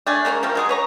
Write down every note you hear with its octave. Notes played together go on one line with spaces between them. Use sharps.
A3 D4 G#5
G#3 A#3 C4 C#4
F3 G3 A3 A#4
F#3 G#3 G#4
B4 C#5 A#5